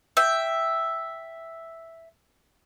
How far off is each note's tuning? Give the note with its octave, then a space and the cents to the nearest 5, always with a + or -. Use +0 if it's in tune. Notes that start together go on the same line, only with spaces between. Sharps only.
E5 +0 G5 +0